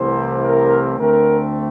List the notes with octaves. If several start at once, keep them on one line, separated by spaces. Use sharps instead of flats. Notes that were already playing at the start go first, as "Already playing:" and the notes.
Already playing: C2 C3 E3 A3 C4 C5
A#4
D2 D3 A3 C4 A#4